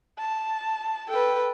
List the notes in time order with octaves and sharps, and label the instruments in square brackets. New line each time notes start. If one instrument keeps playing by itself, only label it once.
[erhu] A5
[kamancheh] A4 B4 [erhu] G5